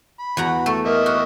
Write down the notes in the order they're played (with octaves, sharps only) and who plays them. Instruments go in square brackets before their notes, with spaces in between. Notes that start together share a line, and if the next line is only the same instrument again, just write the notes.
[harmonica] B5
[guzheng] E2 F#5 A#5 [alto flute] F#4
[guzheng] A3 [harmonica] A4
[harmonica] A#3 D#5 E5 [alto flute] A#4
[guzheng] F#4